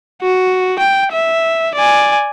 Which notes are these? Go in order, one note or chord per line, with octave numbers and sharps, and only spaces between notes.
F#4
G5
E5
D5 G#5